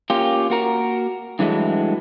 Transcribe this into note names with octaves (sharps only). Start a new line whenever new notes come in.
A#3 C#4 F4 G4
A#3 F#4 A#4
G2 E3 F#3 G#3 A3